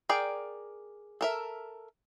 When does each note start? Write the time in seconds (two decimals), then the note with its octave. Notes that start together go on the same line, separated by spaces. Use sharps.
0.09 G#4 A#4 D5 G5
1.21 A4 A#4 E5